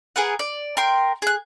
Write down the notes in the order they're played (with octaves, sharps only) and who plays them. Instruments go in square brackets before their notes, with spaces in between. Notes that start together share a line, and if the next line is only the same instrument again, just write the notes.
[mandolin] G#4 A#4 B4 F#5
D5
A#4 G5 C6
G#4 F#6